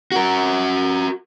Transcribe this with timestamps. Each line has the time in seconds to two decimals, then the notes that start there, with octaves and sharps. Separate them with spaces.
0.12 F#4 A#4